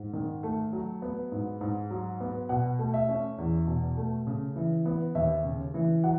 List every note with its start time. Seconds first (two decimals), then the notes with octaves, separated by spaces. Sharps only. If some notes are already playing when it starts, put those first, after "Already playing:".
Already playing: G#2
0.13 D#3
0.43 A3
0.73 F#3
1.02 B3
1.32 G#2
1.61 G#2
1.90 F#3
2.20 B3
2.49 B2 F#5
2.79 A3
2.94 E5
3.09 C#4
3.38 E2
3.67 B2
3.97 A3
4.27 C#3
4.56 E3
4.85 B3
5.15 D#2 E5
5.45 C#3
5.74 E3
6.04 F#3 F#5